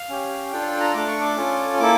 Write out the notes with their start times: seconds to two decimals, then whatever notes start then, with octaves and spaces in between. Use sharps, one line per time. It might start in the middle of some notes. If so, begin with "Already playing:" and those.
Already playing: F5
0.09 C#4 G4
0.52 D4 F4 A4 G5
0.62 F5
0.66 G5
0.80 A#5
0.94 A3 D4 A4 D6
1.08 C#6
1.21 D6
1.36 C#4 F4 A4
1.80 A#3 E4 A4 D6